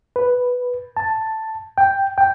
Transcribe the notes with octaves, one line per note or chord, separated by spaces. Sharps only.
B4
A5
G5
G5